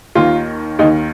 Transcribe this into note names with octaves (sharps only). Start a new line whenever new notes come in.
D#2 D#3 F4
D#2 D#3 D#4